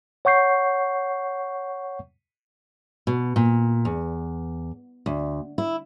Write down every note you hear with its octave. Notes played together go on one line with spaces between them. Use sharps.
C#5 F#5 C#6 G6 C7
B2
A#2
E2
D2
E4